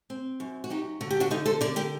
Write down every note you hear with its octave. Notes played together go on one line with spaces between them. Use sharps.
C4
F#2
F#4
F#3 D#4 G4
D3 F#4
G4
D4 F#4
D3 D#4
A4 C5
D3 A#4 D5
G4 A#4